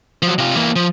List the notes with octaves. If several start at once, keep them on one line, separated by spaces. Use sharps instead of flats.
F3 F#3
C3 F4
E3 A#3
F3